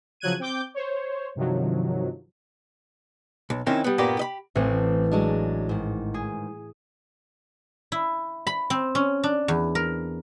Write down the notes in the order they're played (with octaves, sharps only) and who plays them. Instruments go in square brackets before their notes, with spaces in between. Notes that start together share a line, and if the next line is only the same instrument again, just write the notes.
[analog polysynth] C#3 F3 F#3 F#6 G#6 D#7
C4 G5 D6 G6
C5 C#5
G2 C3 D#3 F3 F#3
[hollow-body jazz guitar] B1
D#3 C4 C#4 D#4 E4 A#4
G3 B3
G2 A#2 A#3 B3 G4 D5
G4 D#5 B5
[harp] A1 A2 [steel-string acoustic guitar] E3 C4
[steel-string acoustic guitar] F#3 G#3 D4
G#2 D#3
[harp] G#4
[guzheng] E4
B5
C4
C#4
D4
E2
A#4